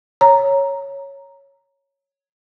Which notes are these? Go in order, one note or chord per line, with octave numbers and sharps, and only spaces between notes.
C#5 A#5